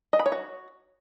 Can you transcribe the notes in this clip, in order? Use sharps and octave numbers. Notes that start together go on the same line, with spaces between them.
D#5
B5
C#5
F#4